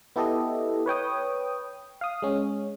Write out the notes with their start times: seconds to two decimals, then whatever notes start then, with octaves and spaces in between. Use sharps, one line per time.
0.16 B3 E4 G4 A4 D#5
0.86 B4 C#5 G5 D#6
2.01 F5 D#6
2.22 G#3 C#4